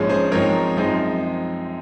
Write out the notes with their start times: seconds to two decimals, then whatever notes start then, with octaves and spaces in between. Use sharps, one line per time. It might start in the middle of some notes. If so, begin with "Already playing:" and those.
Already playing: A#1 G#2 F3 G#3 C#4
0.09 G#4 C5
0.32 G#2 F3 C4 D#4 A#4 C#5
0.77 F#2 F3 G#3 C4 D#4